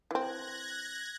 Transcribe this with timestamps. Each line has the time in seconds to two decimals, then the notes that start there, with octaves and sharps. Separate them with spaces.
0.11 E3 C4 F#6 G#6 A#6